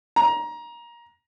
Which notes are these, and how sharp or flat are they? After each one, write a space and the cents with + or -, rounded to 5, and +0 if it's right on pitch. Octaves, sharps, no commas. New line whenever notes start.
A#5 +20